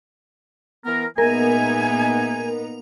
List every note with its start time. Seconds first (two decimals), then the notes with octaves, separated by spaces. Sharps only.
0.85 E3 B3 A#4
1.18 A#2 G#3 B3 D#4 A#4 E5 G#5